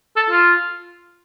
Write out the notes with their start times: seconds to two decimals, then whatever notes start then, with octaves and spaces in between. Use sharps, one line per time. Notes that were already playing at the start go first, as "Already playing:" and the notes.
0.17 A4
0.30 F4